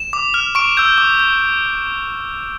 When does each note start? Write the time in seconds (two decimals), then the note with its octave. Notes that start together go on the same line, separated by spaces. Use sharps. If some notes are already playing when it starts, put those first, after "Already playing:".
Already playing: E7
0.13 D6
0.34 F6
0.55 C#6 D7
0.77 E6 G6
0.98 D6
1.19 G6